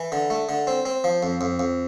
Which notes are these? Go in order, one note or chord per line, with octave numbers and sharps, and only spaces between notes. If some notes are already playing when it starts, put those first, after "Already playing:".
Already playing: E3
D3
A3
D3
C4
C4
F3
F2
F2
F2